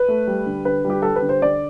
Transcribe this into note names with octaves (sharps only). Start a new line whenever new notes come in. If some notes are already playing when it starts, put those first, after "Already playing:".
Already playing: B4
A3
G3
D3
D3 B4
G3
G4
G3 A4
B4
D3
C5
D3 D5